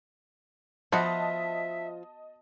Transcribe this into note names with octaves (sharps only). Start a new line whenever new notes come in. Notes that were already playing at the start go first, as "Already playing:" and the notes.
F3 B3 F#4 D#5 E5 A5